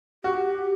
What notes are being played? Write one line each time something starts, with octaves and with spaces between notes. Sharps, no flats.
F#4 G4